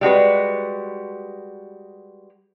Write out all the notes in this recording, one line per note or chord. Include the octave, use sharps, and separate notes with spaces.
G3 G#3 F#4 B4